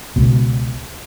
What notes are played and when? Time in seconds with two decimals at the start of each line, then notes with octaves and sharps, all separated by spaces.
0.16 C#2 B2